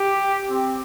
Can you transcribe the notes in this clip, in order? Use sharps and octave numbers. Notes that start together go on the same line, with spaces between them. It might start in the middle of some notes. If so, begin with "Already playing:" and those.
Already playing: G4
C4 G4